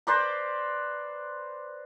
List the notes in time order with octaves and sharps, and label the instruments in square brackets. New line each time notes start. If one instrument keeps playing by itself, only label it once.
[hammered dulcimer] B4 C5 D5 A#5